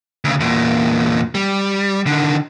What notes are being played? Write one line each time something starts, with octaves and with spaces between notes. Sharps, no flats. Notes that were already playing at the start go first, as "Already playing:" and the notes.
D2 C#3
E2 A#2
G3
D3 D#3